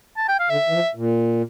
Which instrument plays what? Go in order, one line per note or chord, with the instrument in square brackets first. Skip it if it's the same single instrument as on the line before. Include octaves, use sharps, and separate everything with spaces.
[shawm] A5
G5
F5
[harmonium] D3 [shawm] E5
[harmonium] E3
F3
A#2